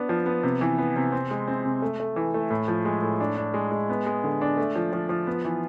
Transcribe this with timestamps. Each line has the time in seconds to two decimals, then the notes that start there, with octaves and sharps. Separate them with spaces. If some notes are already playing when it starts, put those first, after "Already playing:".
Already playing: B3 D4
0.09 F3
0.26 B3
0.43 C3
0.61 E3
0.78 B3
0.96 C3
1.12 C4
1.31 G#3
1.48 C4
1.65 C3
1.82 A3
2.00 A3
2.16 E3
2.34 A3
2.50 A2
2.68 F3
2.85 G#3
3.02 A2
3.20 D4
3.37 D4
3.54 G#3
3.71 G#3
3.90 B3
4.06 G#3
4.24 D3
4.41 D4
4.57 A3
4.75 F3
4.93 F3
5.09 F3
5.27 B3
5.45 E3